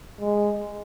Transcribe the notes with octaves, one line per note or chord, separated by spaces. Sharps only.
G#3